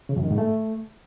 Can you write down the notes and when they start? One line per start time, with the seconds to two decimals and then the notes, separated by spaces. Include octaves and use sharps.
0.09 C#3
0.16 F#2
0.24 D#3
0.31 G#2
0.38 A3